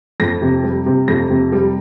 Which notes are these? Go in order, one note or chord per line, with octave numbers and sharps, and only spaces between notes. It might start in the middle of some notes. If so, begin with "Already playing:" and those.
F2 A#6
C3
G3
C3
F2 A#6
C3
G3